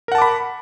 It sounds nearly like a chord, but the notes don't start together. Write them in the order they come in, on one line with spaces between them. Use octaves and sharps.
A#4 F#5 A5 D6 B5